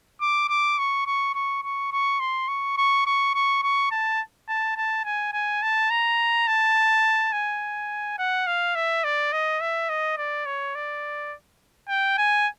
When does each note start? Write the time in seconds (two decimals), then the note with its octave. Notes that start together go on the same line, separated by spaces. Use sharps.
0.21 D6
0.49 D6
0.78 C#6
1.06 C#6
1.34 C#6
1.63 C#6
1.92 C#6
2.20 C6
2.48 C#6
2.77 C#6
3.06 C#6
3.34 C#6
3.63 C#6
3.91 A5
4.48 A5
4.77 A5
5.05 G#5
5.33 G#5
5.62 A5
5.90 A#5
6.47 A5
7.32 G#5
8.18 F#5
8.47 F5
8.75 E5
9.04 D5
9.32 D#5
9.60 E5
9.89 D#5
10.18 D5
10.46 C#5
10.75 D5
11.88 G5
12.18 G#5